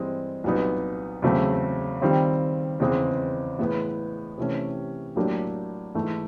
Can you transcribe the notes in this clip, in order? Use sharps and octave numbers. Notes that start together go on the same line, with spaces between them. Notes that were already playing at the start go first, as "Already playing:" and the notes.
Already playing: G2 E3 G#3 C4
C2 A#2 F#3 B3 D#4
E2 C#3 F#3 A3 C4
D#3 G3 C4 F4
E2 C#3 E3 G#3 C4
A2 E3 G#3 B3 E4
C3 E3 A3 C#4
A2 F#3 A#3 D4 G4
G#2 E3 A3